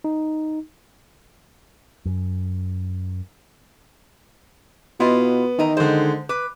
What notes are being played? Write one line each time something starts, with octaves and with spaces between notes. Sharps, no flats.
D#4
F#2
B2 B3 E4 F4 D#5
D#3 E3 D#5 A#5
D3 G#3 C5
B4 D6